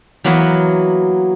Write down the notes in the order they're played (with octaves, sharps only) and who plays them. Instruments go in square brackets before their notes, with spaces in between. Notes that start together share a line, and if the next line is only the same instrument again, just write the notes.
[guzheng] E3 F#3 A#3 B3 F#4